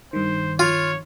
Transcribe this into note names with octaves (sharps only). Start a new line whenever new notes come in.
G2 D#3 C5
F4 C#5